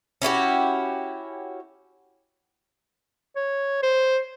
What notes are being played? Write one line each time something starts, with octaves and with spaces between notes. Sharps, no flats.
C#4 E4 F#4 G4
C#5
C5